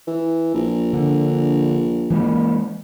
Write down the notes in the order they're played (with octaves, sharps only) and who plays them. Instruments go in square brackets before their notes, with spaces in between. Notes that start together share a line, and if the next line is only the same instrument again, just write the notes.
[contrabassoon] E3
A#1
[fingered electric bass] D3
E3 G#3 A#3